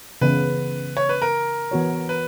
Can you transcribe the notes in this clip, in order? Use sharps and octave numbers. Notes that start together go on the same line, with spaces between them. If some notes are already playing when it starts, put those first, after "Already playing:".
C#3 E3 B3 B4
C#5
B4
A#4
E3 B3 F#4 C#5
B4